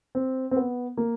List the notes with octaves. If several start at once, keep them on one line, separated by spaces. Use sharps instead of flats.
C4
C4
B3
A#3